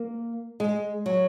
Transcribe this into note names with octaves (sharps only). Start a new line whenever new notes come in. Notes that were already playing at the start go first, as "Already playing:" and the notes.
Already playing: A#3
G#3
F#3